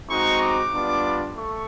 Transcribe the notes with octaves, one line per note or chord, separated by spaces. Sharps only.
G#3 C4 D#4 F#4 C#6
D6
G3 B3 D4 F4
A3 C#6